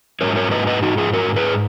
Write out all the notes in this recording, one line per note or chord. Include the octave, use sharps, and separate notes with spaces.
G#2 D#3 F#3 A#4 C#5
A#4 C#5
B4 D#5
B4 D#5
D#4 F#4
F4 G#4
F#4 A#4
G#4 B4